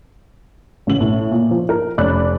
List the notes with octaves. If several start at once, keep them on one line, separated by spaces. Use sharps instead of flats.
A1 C#3 F#7
A2
A#2
F3
A#4
F1 C#4 D5 B5 F#6